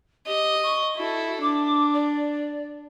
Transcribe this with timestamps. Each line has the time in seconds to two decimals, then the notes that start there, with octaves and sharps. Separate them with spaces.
0.27 G4 D#5
0.63 C#6
0.97 E4 F#4 A4
1.42 D4 D6
1.93 D5